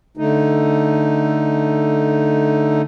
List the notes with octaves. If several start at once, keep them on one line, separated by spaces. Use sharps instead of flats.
D3 A3 D#4